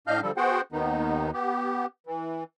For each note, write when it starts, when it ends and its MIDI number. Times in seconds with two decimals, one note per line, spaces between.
0.07 0.21 45
0.07 0.21 62
0.07 0.21 75
0.07 0.21 77
0.07 0.21 89
0.07 0.21 91
0.22 0.31 50
0.22 0.31 53
0.22 0.31 55
0.22 0.31 69
0.37 0.61 59
0.37 0.61 66
0.37 0.61 68
0.37 0.61 72
0.37 0.61 78
0.37 0.61 79
0.72 1.31 39
0.72 1.31 51
0.72 1.31 59
0.72 1.31 63
1.33 1.86 59
1.33 1.86 67
2.07 2.44 52